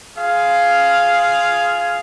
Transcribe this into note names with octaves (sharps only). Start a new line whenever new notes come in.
F4 G#4 F5